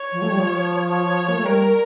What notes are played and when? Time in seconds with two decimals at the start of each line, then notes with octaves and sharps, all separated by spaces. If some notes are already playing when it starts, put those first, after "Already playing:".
Already playing: C#5
0.12 F3
0.22 A3
0.30 G3
0.39 F3
0.91 C#5
1.28 A#3
1.37 A3
1.45 G3 A#4